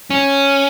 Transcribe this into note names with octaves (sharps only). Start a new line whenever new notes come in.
C#4